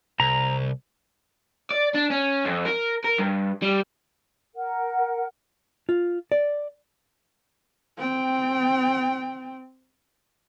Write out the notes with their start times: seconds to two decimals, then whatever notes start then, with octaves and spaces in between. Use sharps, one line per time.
0.20 C2 A#5
1.71 D5
1.95 D4
2.11 C#4
2.45 F2
2.65 A#4
3.04 A#4
3.18 G2
3.62 G3
4.55 A#4 F#5
5.89 F4
6.32 D5
7.98 C4 G5